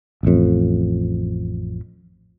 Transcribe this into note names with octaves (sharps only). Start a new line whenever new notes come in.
A1 F2